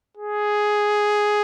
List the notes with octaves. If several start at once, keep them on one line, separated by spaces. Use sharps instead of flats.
G#4